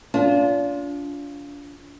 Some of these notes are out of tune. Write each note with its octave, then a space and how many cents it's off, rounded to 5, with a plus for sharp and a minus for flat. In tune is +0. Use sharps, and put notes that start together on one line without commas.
D4 -40 F4 +0